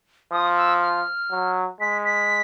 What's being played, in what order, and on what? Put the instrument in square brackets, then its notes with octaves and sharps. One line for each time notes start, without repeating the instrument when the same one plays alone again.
[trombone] F3 [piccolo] D#6
[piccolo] E6
F6
[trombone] F#3
[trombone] G#3 [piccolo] B6
[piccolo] B6